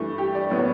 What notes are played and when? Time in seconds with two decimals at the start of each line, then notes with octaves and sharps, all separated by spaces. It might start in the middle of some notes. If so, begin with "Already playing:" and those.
Already playing: G2 E3 A3
0.18 G4
0.35 D5
0.50 A2 F#3 B3 D5